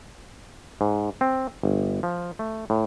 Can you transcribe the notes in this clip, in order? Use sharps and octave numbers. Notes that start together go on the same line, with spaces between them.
G#2
C4
G1
F3
A3
A2